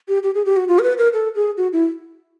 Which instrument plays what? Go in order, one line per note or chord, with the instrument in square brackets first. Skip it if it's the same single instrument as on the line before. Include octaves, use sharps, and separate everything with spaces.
[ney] G4
G4
G#4
G4
F#4
F4
A#4
B4
A#4
A4
G#4
F#4
E4